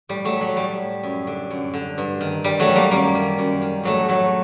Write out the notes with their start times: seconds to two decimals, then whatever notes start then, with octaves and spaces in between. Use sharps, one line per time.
0.09 A2 G3
0.25 F#3 A3
0.41 F#3
0.56 A2 G3
1.03 F#2
1.27 D3
1.50 F#2
1.74 D3
1.98 G2
2.21 D#3
2.44 G2 G3
2.60 F#3 A3
2.68 D#3
2.75 G3 A#3
2.91 F#2 G3 A#3
3.15 D#3
3.39 F#2
3.62 D#3
3.84 A2 F#3 A3
4.08 F#3 A3